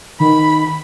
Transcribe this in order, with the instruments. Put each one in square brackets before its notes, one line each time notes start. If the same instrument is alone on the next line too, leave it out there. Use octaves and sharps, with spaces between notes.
[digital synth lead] D#3 [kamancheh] B5